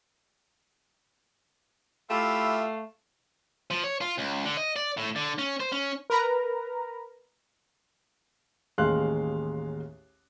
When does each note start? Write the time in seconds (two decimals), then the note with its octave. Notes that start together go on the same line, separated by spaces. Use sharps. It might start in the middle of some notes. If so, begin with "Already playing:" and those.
2.10 A3 E4 F4 G4 E5 F5
3.71 F3
3.84 C#5
4.01 F4
4.18 C#2
4.45 D3
4.57 D#5
4.76 D5
4.97 A2
5.16 D3
5.39 C#4
5.60 C5
5.72 C#4
6.10 A#4 B4 A#5
8.78 A1 D#2 G#3 F5 C6 F#6